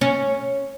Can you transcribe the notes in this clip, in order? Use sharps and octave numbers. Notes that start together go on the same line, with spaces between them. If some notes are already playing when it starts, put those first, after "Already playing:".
C#4